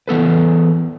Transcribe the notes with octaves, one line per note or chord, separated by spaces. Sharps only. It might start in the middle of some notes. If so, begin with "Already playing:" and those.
E3 B3 A4 B4